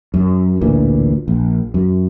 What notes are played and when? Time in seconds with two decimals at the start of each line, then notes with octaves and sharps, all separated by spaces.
0.14 F#2
0.61 A1 D2 A#2 E3
1.28 A#1
1.74 F#2